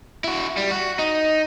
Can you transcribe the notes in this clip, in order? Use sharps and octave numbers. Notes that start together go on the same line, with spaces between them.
E4 F#4
G3
F#4
D#4